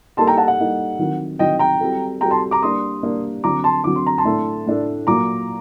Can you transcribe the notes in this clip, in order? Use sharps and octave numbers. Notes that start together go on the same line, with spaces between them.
G3 A#3 D#4 A4 A5 C6
G5 A#5
F#5 A5
F#5
G3 A#3 D#4 A4
D#3 F#3 C4
D#3 F#3 C4 D#5 G5
G5 A#5
G3 C4 F#4 A4
G3 C4 F#4 A4 G5 A#5
A5 C6
A#5 D6
G3 A#3 D4 C6 D#6
G3 A#3 D4
D3 F#3 C4 A#5 D6
A5 C6
D3 F#3 C4 D6
C6
A#5
A5 C6
A2 A3 D4 A4
A2 A3 D4 A4
A#2 F#3 A#3 A#5 D6